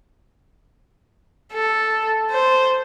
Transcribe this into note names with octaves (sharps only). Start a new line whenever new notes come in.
A4
C5